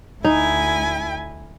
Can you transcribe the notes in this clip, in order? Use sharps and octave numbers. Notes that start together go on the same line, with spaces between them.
D2 D#4 E4 G#5